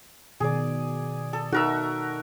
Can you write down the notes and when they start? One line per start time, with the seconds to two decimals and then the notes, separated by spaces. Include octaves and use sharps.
0.40 B2 D#3 G#4 D5
1.33 A4
1.52 D#4 F#4 A4 A#4 E5